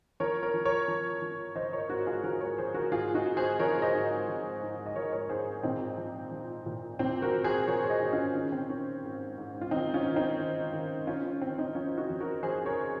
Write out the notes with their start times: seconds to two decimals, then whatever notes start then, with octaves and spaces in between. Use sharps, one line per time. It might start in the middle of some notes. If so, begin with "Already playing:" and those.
0.20 F3 A#4 C#5
0.42 A#4 C#5
0.54 F3
0.65 A#4 C#5
0.88 F3
1.22 F3
1.56 F3 C5 D#5
1.73 A#4 C#5
1.89 G#2 F#4 A#4
2.06 F4 G#4
2.24 F3 F#4 A#4
2.41 A#4 C#5
2.58 F3 G#4 C5
2.75 F#4 A#4
2.91 G#2 F4 G#4
3.14 D#4 F#4
3.26 G#2
3.37 G#4 C5
3.59 F3 A#4 C#5
3.82 C5 D#5
3.94 G#2
4.28 F3
4.62 G#2
4.86 D#5
4.95 F3 A#4 C#5
5.13 A#4 C#5
5.29 G#2 G#4 C5
5.63 A#2 C4 D#4
5.97 F3
6.31 F3
6.66 A#2
6.99 A#2 C4
7.22 F#4 A#4
7.34 F3
7.44 G#4 C5
7.67 F3 A#4 C#5
7.84 C#5
7.89 C5 D#5
8.02 A#2
8.12 C#4 F4
8.35 D#3 C#4
8.52 C4
8.69 D#3 C#4
9.03 G#2
9.38 G#2
9.61 F4
9.71 D#3 C4 D#4
9.94 C#4 F4
10.05 D#3
10.16 C4 D#4
10.39 D#3
10.73 D#3
11.07 D#3 C#4 F4
11.24 C#4
11.41 D#3 C4
11.58 C4 D#4
11.75 F2 C#4 F4
11.98 D#4 F#4
12.10 F2
12.20 F#4 A#4
12.43 F2 G#4 C5
12.66 A#4 C#5